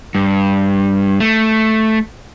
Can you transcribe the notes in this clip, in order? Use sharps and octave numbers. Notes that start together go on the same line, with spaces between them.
G2
A3